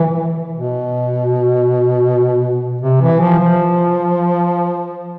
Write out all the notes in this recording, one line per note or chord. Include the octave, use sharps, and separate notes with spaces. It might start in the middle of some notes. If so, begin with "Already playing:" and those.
Already playing: E3
B2
C3
E3
F3
F3